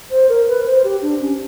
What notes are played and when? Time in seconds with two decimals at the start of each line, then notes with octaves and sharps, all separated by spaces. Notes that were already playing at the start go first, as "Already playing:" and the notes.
0.11 C5
0.29 A#4
0.48 B4
0.66 C5
0.84 G4
1.02 D4
1.21 C#4